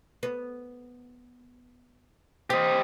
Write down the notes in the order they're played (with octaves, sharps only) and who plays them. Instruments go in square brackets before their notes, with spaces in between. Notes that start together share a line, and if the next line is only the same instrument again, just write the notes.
[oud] B3
[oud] C4 [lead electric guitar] G4 D#5